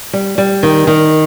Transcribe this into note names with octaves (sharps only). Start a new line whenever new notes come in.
G3
G3
D#3
D#3